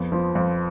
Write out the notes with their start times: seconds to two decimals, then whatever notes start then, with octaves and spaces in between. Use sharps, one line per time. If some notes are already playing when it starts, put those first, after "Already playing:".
Already playing: F2 B3
0.12 F3
0.35 F2